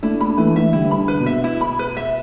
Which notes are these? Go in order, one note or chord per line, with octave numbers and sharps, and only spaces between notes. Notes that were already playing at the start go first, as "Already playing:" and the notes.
A3 D4 E4
A3 D4 B5
E3 A3 B4
E3 A3 E5
D3 G3 E4
B5
D3
B4
B2
E5
E4
B5
B4
E5